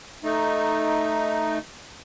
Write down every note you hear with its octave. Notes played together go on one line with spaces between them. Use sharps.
A3 D#4